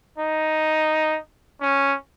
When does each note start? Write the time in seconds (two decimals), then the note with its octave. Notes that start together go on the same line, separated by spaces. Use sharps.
0.18 D#4
1.61 C#4